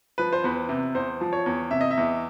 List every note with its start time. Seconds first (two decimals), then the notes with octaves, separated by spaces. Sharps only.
0.18 F3 B4
0.33 C5
0.44 E2 B4
0.69 C3
0.94 E2 C5
1.21 F3
1.33 C#5
1.46 E2
1.71 C3 E5
1.81 D#5
1.91 E5
1.97 E2